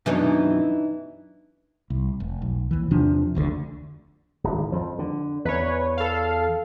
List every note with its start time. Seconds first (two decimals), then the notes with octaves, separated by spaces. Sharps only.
0.06 F#2 B2 E3 D4 D#4
1.90 C2
2.20 F1
2.42 B1
2.71 D#2 E3
2.91 E2 C3 F3 D4
3.35 F1 D2 A#2 D3
4.44 D1 G#1
4.72 F2 F3
4.99 D3
5.45 E2 B4 C#5
5.97 A4 F5